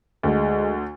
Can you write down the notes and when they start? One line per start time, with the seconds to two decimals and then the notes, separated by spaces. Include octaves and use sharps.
0.24 D2 G#3